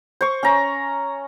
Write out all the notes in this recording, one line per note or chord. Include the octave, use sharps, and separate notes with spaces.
C5 C#6
C#4 A#5